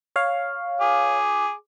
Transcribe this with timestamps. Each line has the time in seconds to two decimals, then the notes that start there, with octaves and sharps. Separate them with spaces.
0.16 C#5 F5
0.81 G#4 D6